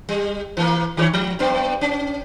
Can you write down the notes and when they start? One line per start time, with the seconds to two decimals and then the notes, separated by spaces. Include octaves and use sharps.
0.09 G3
0.57 E3 A#3
0.97 D#3 A#4 C#5
1.13 F3
1.39 G2 B3
1.81 C#4